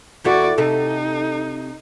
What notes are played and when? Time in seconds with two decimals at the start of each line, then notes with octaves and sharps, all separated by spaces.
0.24 E2 E4 F#4 A4 D5
0.58 C3 D#4 A4